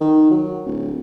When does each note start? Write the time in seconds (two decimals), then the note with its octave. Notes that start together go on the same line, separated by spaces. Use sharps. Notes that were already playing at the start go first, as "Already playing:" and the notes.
0.01 D#3
0.31 F#3
0.66 D1